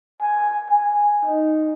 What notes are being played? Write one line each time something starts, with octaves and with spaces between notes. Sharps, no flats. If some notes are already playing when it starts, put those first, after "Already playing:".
G#5
G#5
D#4